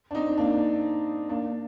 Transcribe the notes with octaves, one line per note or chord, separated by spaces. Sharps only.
D4
C4 D#4
A#3 D4
A#3 D4